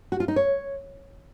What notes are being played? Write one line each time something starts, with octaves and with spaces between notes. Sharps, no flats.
F#4
F4
D#4
C#5